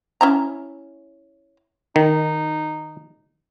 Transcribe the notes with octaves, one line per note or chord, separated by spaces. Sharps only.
C#4 E4 A#5
D#3 D#4